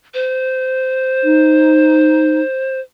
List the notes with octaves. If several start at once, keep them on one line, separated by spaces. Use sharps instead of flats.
C5
D#4